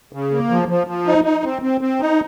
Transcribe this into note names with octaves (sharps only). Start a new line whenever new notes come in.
C#3
A#3
F3
F3
F3
D#4
D#4
C4
C4
C4
D#4